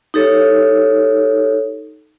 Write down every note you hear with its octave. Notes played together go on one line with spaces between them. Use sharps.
D#4 G4 A4 C#5